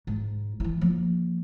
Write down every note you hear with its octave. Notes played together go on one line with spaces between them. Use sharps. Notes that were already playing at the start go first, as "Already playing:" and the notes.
G#2
E3 E4
F3 A#3